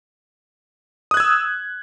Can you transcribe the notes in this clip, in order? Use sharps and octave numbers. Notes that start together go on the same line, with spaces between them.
D#6 E6 F#6 G#6